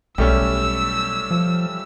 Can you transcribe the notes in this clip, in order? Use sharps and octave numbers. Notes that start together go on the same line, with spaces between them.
B1 G3 A3 C#4 E6
F3